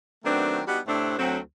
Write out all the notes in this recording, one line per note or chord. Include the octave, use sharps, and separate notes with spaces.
D#3 F#3 A3 B3 C4 D4
G3 B3 D4 D#4 F#4 G4
A2 C3 A3 C4 D4
D2 F#3 C4